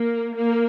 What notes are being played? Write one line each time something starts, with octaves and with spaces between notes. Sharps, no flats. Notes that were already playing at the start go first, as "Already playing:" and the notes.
Already playing: A#3
A#3